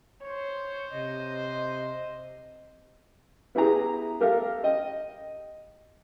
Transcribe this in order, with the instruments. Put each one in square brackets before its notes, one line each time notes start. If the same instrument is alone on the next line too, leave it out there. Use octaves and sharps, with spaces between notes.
[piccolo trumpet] C5 [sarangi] C#5
[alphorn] C3 [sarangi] D#5
[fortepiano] B3 E4 G4 G#4 A#5
G4 A4 A#4 E5 F5
D#5 G5